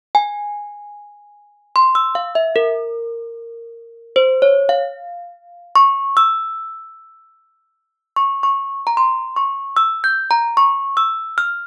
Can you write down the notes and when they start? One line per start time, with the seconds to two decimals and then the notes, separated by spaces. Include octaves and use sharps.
0.15 G#5
1.76 C6
1.95 E6
2.15 F5
2.35 E5
2.56 A#4
4.16 C5
4.42 C#5
4.69 F5
5.75 C#6
6.17 E6
8.16 C#6
8.43 C#6
8.87 A#5
8.97 C6
9.36 C#6
9.77 E6
10.04 G6
10.31 A#5
10.57 C#6
10.97 E6
11.38 F6